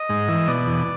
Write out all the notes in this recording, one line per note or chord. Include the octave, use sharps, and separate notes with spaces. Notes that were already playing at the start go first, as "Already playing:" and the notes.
Already playing: D#5
G#2
E3
B2 D5
E2